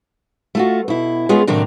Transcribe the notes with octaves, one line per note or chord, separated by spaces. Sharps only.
A3 F4 F#4
B2 E4
G#3 B3 C#4 F4 G#4
A2 C3 D#3 F#3 A#3 D4